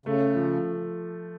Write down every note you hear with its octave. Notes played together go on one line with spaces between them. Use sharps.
C#3 A3
F3